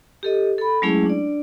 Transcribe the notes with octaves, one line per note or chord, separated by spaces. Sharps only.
G4 A4 D#5
A4 B5
F#3 G#3 A3 C#4 E4 G#4
D4 D5